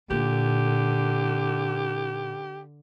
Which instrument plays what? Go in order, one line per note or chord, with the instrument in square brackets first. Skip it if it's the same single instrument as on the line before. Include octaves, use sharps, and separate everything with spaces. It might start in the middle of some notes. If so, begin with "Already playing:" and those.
[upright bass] A#2 [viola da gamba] D3 [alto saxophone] G4